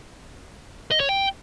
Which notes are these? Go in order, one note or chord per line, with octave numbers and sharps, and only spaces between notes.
D#5
C#5
G5